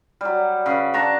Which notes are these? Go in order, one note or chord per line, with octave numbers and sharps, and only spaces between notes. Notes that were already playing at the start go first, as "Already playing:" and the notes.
F#3 G3
C#3 B4
D4 A5 A#5 C#6